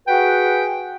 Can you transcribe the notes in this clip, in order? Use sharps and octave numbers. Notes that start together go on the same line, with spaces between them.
F#4 G#4 B4 F#5 G5